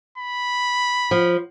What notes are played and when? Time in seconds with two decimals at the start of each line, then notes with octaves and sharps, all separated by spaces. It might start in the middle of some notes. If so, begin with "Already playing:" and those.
0.18 B5
1.11 F3